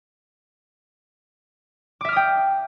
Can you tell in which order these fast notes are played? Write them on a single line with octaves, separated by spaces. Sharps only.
D6 E5 F6 D#6 G5